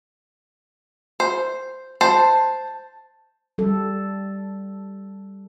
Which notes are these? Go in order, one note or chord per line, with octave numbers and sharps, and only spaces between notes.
C5
C5 A5
G3 A4